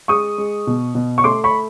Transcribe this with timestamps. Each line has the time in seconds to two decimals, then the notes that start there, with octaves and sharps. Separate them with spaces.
0.08 G#3 C#6 D#6
0.38 G#3
0.67 B2
0.95 B2
1.18 C#6
1.24 A3 C6 D6
1.44 B5 C#6